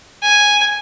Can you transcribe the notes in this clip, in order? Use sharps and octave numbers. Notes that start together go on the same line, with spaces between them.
G#5